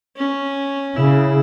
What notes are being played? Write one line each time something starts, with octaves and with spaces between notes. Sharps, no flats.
C#4
C#3 E4